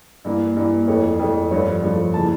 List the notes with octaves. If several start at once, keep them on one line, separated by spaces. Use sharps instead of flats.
G2 E3 A#3
G2 E3 A#3
F2 E3 A3 C#5
F2 E3 A3
G2 F3 A3 C#5
G2 F3 A3
C#3 E3 A#3 A5